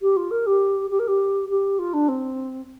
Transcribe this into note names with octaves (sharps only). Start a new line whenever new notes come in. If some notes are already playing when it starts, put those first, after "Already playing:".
G4
F4
A#4
G4
G4
A#4
G4
G4
F4
D4
C4